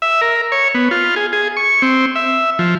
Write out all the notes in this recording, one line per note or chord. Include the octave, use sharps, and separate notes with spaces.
E5
A#4
C#5
B3
F4
G#4
G#4
C#6
C4
E5
F3